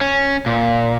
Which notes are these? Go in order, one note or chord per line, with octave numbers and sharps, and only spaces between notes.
C#4
A#2